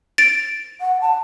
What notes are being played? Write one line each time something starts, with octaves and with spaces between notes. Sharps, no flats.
A6 D7
F#5
A5